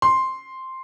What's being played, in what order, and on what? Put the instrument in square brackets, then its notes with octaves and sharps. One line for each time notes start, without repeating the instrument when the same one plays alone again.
[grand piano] C6